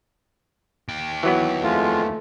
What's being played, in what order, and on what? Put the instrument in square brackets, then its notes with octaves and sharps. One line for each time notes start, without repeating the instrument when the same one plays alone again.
[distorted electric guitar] D#2 G5
[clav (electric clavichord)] E3 F#3 B3
[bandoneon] F2 G#3 F4 [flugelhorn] A3